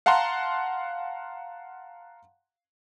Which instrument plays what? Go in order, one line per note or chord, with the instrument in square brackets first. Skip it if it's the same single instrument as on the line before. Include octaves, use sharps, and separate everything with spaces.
[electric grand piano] F5 F#5 A5 A#5 C6 F#6